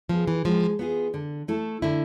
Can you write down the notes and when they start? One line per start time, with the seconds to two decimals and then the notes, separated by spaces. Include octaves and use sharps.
0.09 F3 B3 F4 G#4
0.28 E3
0.45 F3 G#3
0.79 B3 F4 G#4
1.14 D3
1.48 A3 E4 A4
1.82 D3 E4